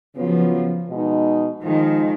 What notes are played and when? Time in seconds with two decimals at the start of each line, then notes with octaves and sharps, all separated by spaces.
0.15 C#3 F3 F#3 B3 F4
0.88 B2 G#3 D#4
1.62 D#3 F3 G#3 D#4